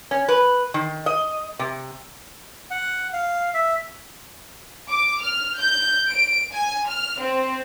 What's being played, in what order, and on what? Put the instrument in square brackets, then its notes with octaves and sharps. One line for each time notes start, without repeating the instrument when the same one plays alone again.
[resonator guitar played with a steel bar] C#4
B4
D#3
D#5
C3
[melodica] F#5
F5
E5
[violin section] D6
F6
G6
D7
G#5
F6
C4